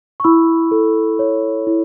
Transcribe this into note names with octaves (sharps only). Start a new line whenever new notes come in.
C#6
E4 B5 E6
A4
C#5
E4